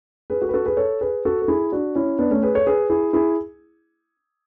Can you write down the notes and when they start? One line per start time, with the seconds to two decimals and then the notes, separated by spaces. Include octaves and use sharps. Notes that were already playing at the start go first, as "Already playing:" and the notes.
0.30 G#4 B4
0.42 F#4 A4
0.49 B4
0.54 F#4 A4
0.66 G#4 B4
0.77 A4 C#5
1.01 G#4 B4
1.25 F#4 A4
1.42 A4
1.48 E4 G#4
1.72 D4 F#4
1.95 C#4 E4
2.19 B3 D4
2.31 A3 C#4
2.43 G#4 B4
2.55 A4 C#5
2.66 G#4 B4
2.90 E4 G#4
3.13 E4 G#4